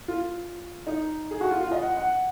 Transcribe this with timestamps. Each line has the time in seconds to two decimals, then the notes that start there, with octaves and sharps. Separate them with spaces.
0.08 F4
0.87 D#4
1.31 G#4
1.41 F#4
1.51 F4
1.61 F4
1.72 D#5
1.82 F#5
1.97 F#5